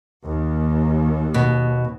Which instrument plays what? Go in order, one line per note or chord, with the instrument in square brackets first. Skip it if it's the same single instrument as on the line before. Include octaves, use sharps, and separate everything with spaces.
[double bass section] D#2
[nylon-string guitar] B2